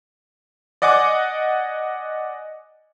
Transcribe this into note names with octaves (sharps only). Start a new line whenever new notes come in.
D5 D#5 F#5 G#5 D6